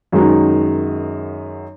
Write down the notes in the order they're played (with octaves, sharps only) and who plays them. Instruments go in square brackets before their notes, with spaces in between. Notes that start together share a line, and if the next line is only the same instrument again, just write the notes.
[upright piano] F#2 D#3 G#3 D#4 F#4